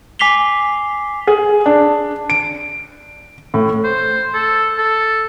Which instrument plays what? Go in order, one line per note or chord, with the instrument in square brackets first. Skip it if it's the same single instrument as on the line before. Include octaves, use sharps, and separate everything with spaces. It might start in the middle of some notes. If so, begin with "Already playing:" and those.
[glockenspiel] G#5 D6 B6 C7 F7 G7
[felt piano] G#4
D4
D7
A2
[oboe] C5
A4
A4